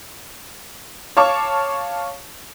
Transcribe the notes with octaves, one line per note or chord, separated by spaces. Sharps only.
C#5 F5 A5 C#6 D6